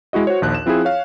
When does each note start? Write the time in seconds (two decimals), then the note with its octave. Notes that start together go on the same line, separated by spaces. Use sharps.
0.13 G#3 E4 F#4 D#5
0.27 F#4 C5 C#5
0.42 A#1 D#2 F#6
0.55 E7
0.66 F3 C4 E4 F4 G#4
0.85 C#5 F5